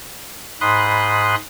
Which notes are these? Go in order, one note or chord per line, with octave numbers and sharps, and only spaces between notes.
G#2 B5 C6 D#6 F#6